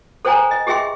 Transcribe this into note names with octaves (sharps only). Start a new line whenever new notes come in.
A4 C5 C#5 G5 G#5 A#5
D#5
G4 G#4 D#5 E5 G5 C6